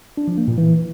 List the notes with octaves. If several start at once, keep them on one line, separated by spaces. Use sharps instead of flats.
D4
F3
A#3
A#2
E3